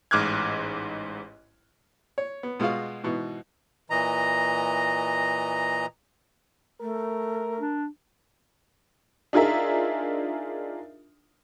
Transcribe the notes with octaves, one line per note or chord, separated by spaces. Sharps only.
A1 G#2 D6 F6 F#6 G#6
C#5
B3
B2 G#3 F4 F#4 F5
G#2 B2 E3
A#2 E3 D#5 A#5
A3 A#4
D4
D4 D#4 F4 G#4 A#4 E5